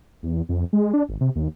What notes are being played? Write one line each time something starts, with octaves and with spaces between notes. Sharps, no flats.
E2
F2
G#3
D4
G#1
C3
D#2